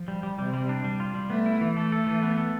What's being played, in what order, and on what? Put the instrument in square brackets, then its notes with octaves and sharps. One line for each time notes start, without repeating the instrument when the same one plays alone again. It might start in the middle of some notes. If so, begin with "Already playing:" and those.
Already playing: [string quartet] F3
[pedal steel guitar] G3
G3
[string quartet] C3 [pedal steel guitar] G3
[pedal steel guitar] G3
D4
G3
F4
G3
[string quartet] A3 [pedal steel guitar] B3
[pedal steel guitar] E4
E3
[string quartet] A3 [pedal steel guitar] A4
[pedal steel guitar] A4
E3
B3
A4